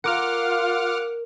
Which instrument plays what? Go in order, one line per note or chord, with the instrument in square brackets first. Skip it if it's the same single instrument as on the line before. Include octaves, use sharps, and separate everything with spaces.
[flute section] F4 C6 [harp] A#4 [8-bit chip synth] F#5 D6 F6